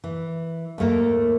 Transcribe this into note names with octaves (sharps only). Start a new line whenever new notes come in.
E3
D#2 G#2 A3 A#3 A#4